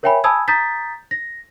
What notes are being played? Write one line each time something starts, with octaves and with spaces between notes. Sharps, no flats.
A#4 C#5 E5 G5 G#5 B5
G#5 A5 B5 D#6 E6 G#6
A#5 D#6 G6 A6 B6
A#6